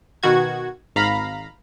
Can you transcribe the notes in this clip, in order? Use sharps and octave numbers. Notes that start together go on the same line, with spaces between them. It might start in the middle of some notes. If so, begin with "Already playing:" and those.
B2 D#3 F#4 G#6
G#1 F5 A#5 B5